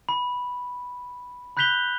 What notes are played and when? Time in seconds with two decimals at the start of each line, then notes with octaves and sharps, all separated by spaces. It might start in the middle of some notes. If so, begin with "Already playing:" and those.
0.09 B5
1.57 B5 F#6 G6 B6 F7 G7